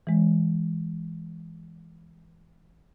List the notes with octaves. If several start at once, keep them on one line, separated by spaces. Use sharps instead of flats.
E3 G#3